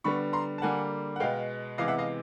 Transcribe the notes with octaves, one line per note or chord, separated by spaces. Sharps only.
D3 G3 B3 B5 C#6
A#5 C6
A5
D3 G3 A#3 F#5 G#5
F#5
B2 G#3 B3 F5 G5
C3 E3 G#3 B3 D#5 F5
E5 F#5
D#5 F5